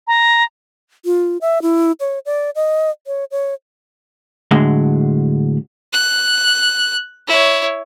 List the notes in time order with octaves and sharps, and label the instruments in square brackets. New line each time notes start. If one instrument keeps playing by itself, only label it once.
[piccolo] A#5
[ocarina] F4
E5
E4
C#5
D5
D#5
C#5
C#5
[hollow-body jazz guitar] A2 D3 F#3 G#3
[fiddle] F#6
E4 C#5